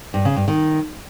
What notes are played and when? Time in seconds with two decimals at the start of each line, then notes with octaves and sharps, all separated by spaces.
0.14 G2
0.25 C#3
0.36 G2
0.48 D#3